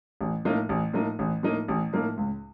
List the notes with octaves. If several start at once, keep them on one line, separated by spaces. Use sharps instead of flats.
A1
A2 F3 A#3 D#4
A1
A2 F3 A#3 D#4
A1
A2 F3 A#3 D#4
A1
A2 F3 A#3 D#4
C#2